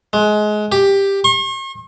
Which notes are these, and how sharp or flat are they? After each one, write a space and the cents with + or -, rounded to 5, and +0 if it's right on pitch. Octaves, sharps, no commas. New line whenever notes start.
G#3 +25
G4 +10
C#6 -45